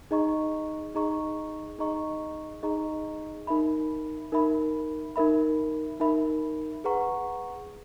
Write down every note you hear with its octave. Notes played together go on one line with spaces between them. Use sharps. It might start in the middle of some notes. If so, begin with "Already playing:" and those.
D#4 G#4 D#5 A#5 C#6
D#4 G#4 D#5 A#5 C#6
D#4 G#4 D#5 A#5 C#6
D#4 G#4 D#5 A#5 C#6
D#4 A#4 E5 B5
D#4 A#4 E5 B5
D#4 A#4 E5 B5
D#4 A#4 E5 B5
G#4 B4 F#5 A#5 C#6